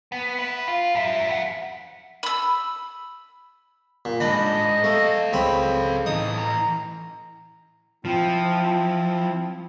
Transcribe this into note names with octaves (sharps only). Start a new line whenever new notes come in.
B3
E4 B4
F4
F#2 E5
F2 F#5
B5 E6
A#2
D2 G#2 D4 D#5 B5
A3 A4 F5
C#2 C4 B5
A2 E3 D#4 D#6
A#5
F3 C4 E4